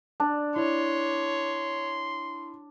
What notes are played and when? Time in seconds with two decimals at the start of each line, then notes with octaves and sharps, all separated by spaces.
0.20 D4 A5
0.56 E4 C#5 C6